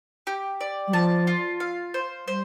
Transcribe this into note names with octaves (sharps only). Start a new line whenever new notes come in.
G4
D5
G3
F3 A5
F4
F5
C5
G3 C5